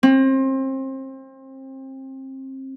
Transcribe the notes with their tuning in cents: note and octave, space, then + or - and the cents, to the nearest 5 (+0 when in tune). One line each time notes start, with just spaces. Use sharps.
C4 +30